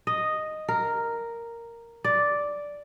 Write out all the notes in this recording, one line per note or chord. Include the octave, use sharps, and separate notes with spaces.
D#5
A#4
D5